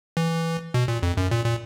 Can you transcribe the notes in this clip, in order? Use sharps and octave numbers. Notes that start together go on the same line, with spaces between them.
E3
B2
A#2
F2
F#2
A#2
A#2